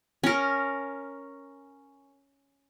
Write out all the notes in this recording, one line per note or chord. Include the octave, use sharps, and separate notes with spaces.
C#4 A#4